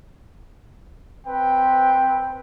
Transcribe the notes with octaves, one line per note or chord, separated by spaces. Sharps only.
C4 B4 G5